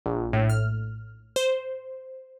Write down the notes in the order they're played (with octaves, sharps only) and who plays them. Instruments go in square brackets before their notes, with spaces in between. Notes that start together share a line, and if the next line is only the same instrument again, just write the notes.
[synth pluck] A#1
A2
F6
C5